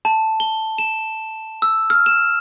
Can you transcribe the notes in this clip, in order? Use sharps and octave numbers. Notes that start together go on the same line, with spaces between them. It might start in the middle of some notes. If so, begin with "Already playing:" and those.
A5
G7
E7
E6
F6
E7